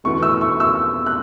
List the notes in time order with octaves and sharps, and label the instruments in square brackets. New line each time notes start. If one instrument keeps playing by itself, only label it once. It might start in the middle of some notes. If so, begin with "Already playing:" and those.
[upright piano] E2 B2 A3 C#6
E6
C#6
E6
F#6